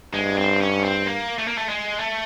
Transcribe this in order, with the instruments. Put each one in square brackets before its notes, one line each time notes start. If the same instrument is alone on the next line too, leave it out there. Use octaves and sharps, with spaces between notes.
[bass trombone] G2 [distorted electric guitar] G#3
[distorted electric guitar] C4
C#4
C4
A#3
A3
A#3
A3
G#3
A3